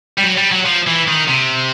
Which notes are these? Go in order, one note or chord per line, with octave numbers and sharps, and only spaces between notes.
G3
F#3
G3
F#3
F3
E3
D#3
C3